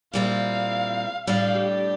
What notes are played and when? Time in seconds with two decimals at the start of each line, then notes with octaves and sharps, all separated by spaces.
0.13 A#2 G3 C4 E4 F5
1.27 A2 G3 D4 F5
1.55 G4